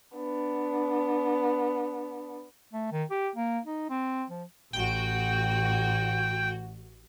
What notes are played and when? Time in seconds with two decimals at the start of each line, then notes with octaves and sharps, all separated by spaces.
0.16 B3 D4
2.73 A3
2.92 D#3
3.11 G4
3.36 A#3
3.65 D#4
3.90 C4
4.30 F3
4.73 A1 F#4 G5